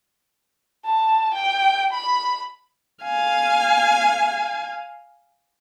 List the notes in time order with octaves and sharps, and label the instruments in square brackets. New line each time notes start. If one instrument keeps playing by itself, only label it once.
[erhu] A5
G5
B5
[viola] F5 G#5